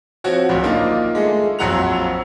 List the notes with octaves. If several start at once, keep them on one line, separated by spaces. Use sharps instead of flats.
F3 C4 F#4 C#5
D1 A#1
D#3 A#3 D4 D#4 F4
G#3 A3
A#1 F2 F#3 F#5 A#5 F7